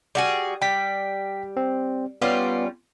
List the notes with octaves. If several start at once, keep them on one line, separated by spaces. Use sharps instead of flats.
G3 F#4 G#4
G3 G5 B6
C4
G3 B3 C#4 F4